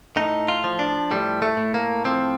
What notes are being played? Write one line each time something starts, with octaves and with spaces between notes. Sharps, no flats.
A2 D#4
F4
F3
D4
A2 G3
A3
A2
A#3
F3 C4